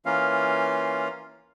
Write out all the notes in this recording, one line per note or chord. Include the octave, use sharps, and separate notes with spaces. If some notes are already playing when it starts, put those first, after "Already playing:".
E3 A#3 C#4 F4 F5